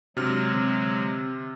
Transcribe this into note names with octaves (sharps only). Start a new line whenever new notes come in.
C3 F#3 G#3 D4 F#4 F6
D3 C4